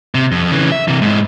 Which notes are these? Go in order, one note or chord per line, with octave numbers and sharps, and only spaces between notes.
C3
F2
C#3 E3
E5
C3 E3
G#2 E4